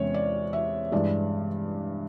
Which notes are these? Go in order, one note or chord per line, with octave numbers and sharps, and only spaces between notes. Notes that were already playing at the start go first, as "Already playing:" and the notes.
Already playing: E2 C3 E3 G#3 C#4 C#5
D5
E5
G2 E3 G#3 D5